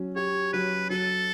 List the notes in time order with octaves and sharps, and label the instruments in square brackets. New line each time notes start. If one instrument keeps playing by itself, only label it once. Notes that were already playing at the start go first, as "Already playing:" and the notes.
Already playing: [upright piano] F#3 C#4
[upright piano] G4 [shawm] C#5
[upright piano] F#3 [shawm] B4
[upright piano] F#3 [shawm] A4